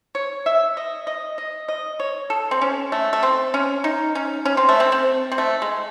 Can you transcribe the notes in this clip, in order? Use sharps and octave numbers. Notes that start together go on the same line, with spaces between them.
C#5
E5
D#5
D#5
D#5
D#5
C#5
A4
C4
C#4
A3
A3
C4
C#4
D#4
C#4
C#4
C4
A3
C4
C4
C4
A3
G#3